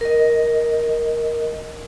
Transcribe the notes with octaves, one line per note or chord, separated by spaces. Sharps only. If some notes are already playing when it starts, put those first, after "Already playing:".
A#4 D#5